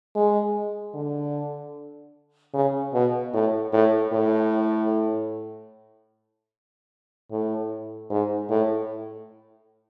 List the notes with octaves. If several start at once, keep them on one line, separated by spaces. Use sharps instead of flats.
G#3
D3
C#3
B2
A2
A2
A2
A2
G#2
A2